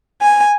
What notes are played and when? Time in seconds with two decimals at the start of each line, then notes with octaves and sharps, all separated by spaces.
0.21 G#5